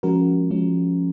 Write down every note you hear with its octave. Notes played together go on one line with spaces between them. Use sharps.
F3 G#3 C#4 F#4 A#4
F3 G#3 C#4